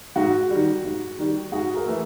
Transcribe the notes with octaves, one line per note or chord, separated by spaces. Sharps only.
G#2 F#4
D#3 G3
G#2
D#3 G3
G#2 F#4 G#4
G#4 A#4
E3 A3